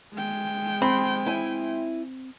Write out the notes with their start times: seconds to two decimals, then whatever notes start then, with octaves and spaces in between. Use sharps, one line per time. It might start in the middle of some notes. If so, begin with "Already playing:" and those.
0.14 G#3 G5
0.82 C4 B5 C6
1.26 E4 G#5